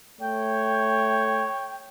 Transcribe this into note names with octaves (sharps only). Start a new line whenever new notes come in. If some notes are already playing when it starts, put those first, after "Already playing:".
A3 C#5 G5